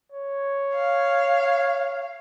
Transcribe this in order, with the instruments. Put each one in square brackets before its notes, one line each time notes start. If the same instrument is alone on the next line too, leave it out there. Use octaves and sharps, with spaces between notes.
[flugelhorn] C#5
[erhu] F5